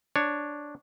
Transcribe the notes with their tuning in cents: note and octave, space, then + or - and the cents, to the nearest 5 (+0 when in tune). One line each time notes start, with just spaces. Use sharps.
D4 +0 C#5 +0